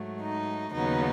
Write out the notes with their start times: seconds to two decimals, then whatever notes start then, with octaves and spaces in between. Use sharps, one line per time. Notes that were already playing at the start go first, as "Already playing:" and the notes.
Already playing: G#2 F#3 A3
0.21 D#4
0.72 D#2 C#3 F#3 B3 D#4